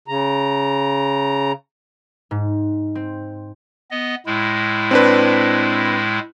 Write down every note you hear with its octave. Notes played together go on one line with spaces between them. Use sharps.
C#3 A#5
G#2
C4
B3 D#5
A2 G#3 E4
C4 D4 B4